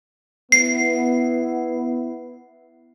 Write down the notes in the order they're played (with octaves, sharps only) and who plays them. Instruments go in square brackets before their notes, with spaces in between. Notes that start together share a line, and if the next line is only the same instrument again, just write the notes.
[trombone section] B3 E4 [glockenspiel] C7